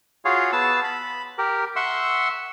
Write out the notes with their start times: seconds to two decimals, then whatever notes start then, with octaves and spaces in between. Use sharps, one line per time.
0.25 F4 F#4 G#4 C#5 F5
0.53 B3 A5 E6
0.84 B5
1.38 G4 A#4
1.76 E5 F#5 C6 C#6 E6